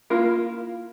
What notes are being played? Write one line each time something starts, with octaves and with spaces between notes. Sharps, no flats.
A#3 E4 F4 A#4